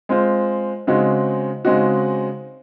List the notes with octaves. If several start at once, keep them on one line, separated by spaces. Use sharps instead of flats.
G#3 C4 F4 C5
C#3 G#3 C4 D#4 F#4
C#3 G#3 C4 D#4 F#4